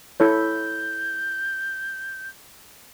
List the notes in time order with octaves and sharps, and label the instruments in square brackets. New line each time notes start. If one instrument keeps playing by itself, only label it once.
[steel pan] E4 A4 C#5 [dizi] G6